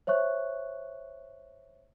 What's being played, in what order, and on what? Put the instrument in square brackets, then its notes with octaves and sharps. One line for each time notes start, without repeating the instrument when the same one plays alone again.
[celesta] C5 C#5 E5 C#6 F#6